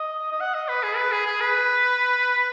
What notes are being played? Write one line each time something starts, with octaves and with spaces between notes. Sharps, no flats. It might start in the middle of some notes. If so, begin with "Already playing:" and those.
Already playing: D#5
D#5
F#5
D#5
B4
G#4
B4
G#4
G#4
B4